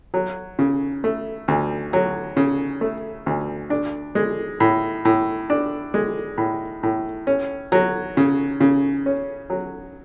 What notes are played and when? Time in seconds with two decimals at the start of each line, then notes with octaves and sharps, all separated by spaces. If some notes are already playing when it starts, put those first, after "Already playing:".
0.14 F#3
0.59 C#3
1.04 A3
1.48 D2
1.93 F#3
2.37 C#3
2.81 A3
3.26 D2
3.70 D4
4.15 G#3
4.60 A2
5.05 A2
5.50 D4
5.94 G#3
6.38 A2
6.83 A2
7.27 C#4
7.72 F#3
8.17 C#3
8.60 C#3
9.06 C#4
9.50 F#3